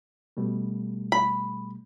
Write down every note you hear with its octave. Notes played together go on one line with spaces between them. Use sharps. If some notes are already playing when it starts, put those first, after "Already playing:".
B2 G3 A3
B5